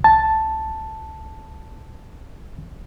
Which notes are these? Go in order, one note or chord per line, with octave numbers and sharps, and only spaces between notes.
C2 A5